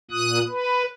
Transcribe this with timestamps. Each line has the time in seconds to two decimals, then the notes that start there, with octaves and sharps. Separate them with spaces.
0.11 A#2 D#6 F#6
0.48 B4